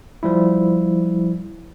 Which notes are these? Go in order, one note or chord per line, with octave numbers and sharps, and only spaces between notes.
F3 G3 E4